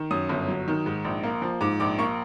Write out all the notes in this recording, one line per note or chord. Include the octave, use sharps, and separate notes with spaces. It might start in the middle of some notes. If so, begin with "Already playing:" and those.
Already playing: D#3
F#2 D#6
G1
F#3
D#3
G#2
A#1
A#3
F3
G#2 D6
A#1 D6
A#3 C#6